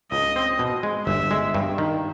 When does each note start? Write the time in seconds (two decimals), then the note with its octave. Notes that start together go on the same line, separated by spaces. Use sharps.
0.12 C#2 D#5
0.36 C4
0.59 B2
0.83 G#3
1.07 G1 E5
1.31 G#3
1.54 G2
1.78 D#3